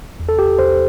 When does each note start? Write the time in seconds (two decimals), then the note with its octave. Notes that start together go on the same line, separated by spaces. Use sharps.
0.20 E2
0.29 A4
0.39 G4
0.59 E2 C5